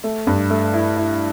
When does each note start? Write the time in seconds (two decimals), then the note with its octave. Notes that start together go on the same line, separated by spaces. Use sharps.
0.04 A3
0.27 G2
0.50 A3
0.73 E4
0.97 E4